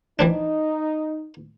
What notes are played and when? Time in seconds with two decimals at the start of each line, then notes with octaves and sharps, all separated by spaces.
0.19 E3 C4 D4 D#4